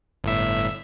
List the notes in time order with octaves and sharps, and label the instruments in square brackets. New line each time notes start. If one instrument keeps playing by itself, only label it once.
[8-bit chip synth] G1 A2 E5